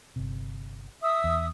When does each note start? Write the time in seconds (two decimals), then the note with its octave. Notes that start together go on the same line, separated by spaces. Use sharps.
0.16 G1 C3
1.02 E5 D#6 E6
1.24 E2